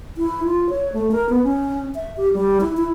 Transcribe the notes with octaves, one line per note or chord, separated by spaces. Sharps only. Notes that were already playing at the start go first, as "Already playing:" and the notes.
E4
F4
C#5
A3
A#4
B3
C#4
E5
G4
G3
E4
E4